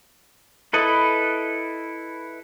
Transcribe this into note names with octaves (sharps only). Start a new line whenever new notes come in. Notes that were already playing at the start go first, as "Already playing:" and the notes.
E4 A4 B4 D#5